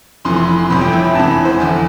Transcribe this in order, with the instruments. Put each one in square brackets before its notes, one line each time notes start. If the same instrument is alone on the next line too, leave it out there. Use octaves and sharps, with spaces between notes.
[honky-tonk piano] F1 F2 E3 C6
C6
B5
C6
G1 F2 C3 E3 B5
G5
E5
B5
E2 C3 E3 A5
B5
C5
F1 E2 D3